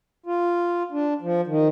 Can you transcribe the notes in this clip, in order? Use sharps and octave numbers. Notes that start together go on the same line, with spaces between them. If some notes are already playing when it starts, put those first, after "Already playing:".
F4
D4
F3
D#3